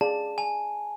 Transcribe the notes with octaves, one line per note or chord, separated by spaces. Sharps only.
G#4 D5 F5 A5
G#5